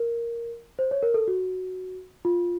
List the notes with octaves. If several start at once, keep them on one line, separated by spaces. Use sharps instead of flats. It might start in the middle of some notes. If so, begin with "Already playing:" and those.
Already playing: A#4
C5
C#5
A#4
A4
F#4
F4